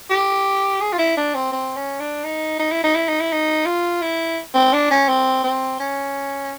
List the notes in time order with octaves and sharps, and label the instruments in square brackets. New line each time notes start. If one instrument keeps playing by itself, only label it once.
[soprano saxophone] G4
G#4
F4
E4
D4
C4
C4
C#4
D4
D#4
D#4
E4
D#4
E4
D#4
E4
D#4
F4
E4
C4
D4
C#4
C4
C4
C#4